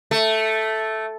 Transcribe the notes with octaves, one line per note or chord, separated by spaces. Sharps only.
A3